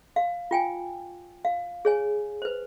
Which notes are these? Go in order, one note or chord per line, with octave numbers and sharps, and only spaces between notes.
F5
F4 G5 G#5
F5
G#4 C#5 G#5
B4 C5